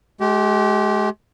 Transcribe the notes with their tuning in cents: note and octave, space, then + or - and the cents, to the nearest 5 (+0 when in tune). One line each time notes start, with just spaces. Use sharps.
G#3 +35 G4 -25